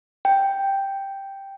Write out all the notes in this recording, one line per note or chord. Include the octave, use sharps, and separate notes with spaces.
G5